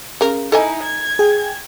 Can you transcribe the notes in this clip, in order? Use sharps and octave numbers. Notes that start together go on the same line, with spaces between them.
C#3 A#4
D#4 E4 A4 D#5 G#5
G#6
G#4 G5